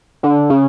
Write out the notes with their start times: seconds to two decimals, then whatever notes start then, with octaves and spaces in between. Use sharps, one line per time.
0.23 D3
0.50 C#3